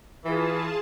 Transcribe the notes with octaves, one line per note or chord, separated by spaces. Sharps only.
E3 F4 G#4 A5